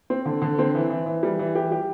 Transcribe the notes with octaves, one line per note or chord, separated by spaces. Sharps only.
C4
D3
D3
C4
E3
E3
E3
G3
E3
G4
G4